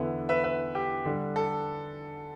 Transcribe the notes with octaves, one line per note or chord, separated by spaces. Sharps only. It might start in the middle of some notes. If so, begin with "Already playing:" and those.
Already playing: E2 D3 B3 E4
B4 E5
B4 E5
G4
D3 G3 D4
A4